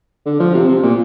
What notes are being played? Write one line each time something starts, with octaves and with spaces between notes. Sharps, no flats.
D3
F3
C3
C3
A#2